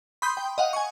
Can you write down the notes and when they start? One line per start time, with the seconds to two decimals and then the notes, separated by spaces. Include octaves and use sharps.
0.22 B5 C6 D#6 G6
0.37 G5
0.58 D#5 F5 F#5
0.73 G#5 C#6